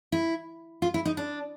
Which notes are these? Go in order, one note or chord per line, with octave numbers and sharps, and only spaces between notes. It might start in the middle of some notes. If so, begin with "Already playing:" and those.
E4
F4
E4
D#4
D4